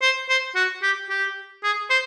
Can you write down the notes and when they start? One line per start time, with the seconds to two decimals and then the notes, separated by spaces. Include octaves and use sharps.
0.02 C5
0.29 C5
0.55 F#4
0.82 G4
1.10 G4
1.63 G#4
1.90 C5